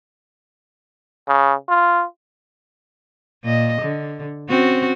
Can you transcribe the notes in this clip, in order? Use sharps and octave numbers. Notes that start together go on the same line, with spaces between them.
C#3
F4
A#2 D#5
D3
C4 C#4 F#4